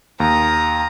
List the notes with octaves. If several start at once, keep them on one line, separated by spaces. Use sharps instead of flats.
D#2 A#5 D#6